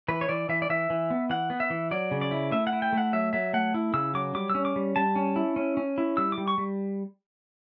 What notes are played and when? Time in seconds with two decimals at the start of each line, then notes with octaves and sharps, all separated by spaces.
0.08 E3 B4
0.21 C#5
0.29 E3 D5
0.49 E3 E5
0.62 D5
0.70 E3 E5
0.90 E3
1.10 B3
1.30 E3 F#5
1.50 B3
1.60 E5
1.70 E3
1.91 F#3 D5
2.11 C#3
2.21 D5
2.31 E4
2.51 A3 E5
2.67 F#5
2.73 E4
2.82 G5
2.93 A3
2.98 F#5
3.13 F#3 E5
3.33 F#3 E5
3.54 A3 F#5
3.74 E4
3.94 C#3 E6
4.14 F#3 D6
4.35 G3 D6
4.50 E6
4.55 C#4
4.65 D6
4.76 G3
4.96 G3 A5
5.16 C#4
5.36 E4
5.56 C#4
5.77 C#4
5.98 E4
6.17 G3 E6
6.32 D6
6.38 G3
6.48 C#6
6.58 G3